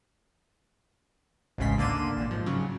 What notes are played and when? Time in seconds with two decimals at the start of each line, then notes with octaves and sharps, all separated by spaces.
1.58 A1 D2 G#2 C#3 C6 B6
1.78 D3 A#3 D5 C6 D#7 E7
2.17 A1 A#2
2.31 G#2 F3
2.46 C#3 F#3